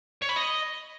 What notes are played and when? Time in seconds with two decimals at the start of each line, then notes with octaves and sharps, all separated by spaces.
0.22 C#5
0.29 B5
0.36 D#5